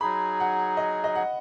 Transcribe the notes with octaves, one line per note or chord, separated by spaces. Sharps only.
F#3 D#4 G#4 B5
F#5
D#5
D#5
F#5